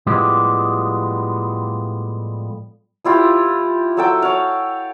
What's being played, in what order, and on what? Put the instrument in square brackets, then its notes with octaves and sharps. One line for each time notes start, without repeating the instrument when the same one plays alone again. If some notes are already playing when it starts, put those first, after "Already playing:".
[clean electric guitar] A2 F3 G3 G#3 B3 G4
[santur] F3 E4 F4 G4
F#3 A4 G5
C#5 F5